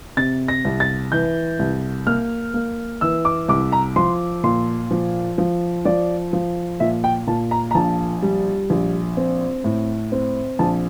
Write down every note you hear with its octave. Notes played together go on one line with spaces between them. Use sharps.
C3 A6
A#6
C2
A6
E3 G6
C2
A#3 F6
A#3
E3 E6
D6
C2 D6
A#5
F3 C6
A#2 C6
F3
F3
F3 D5
F3
A#2 E5
G5
A#2 A5
A#5
A#5
A#1 A5
G3
A#1
C4
A2
C4
A#1 A5